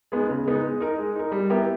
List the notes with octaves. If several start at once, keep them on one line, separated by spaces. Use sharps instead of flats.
G#3 B3 D#4
C#3
G#3 B3 D#4
G#3
D#4 A#4
G#3
D#4 A#4
G3
B3 E4 G4 A#4